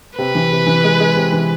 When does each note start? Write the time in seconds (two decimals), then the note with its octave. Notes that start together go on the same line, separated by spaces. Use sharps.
0.18 C3 B4
0.35 E3
0.51 C3
0.67 E3
0.84 G#3
1.00 G#3
1.16 C3
1.32 E3